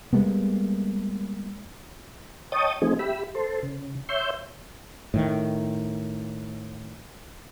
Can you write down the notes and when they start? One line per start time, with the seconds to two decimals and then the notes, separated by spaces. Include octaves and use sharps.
0.13 G3 G#3 A#3 B3
2.52 C#5 D#5 G5 A5 D#6
2.82 F3 A3 C4 D#4 G#4
2.99 G4 E5 B5
3.35 A4 C5
3.63 C#3
4.09 C#5 E5 C6 G6
5.14 A2 D#3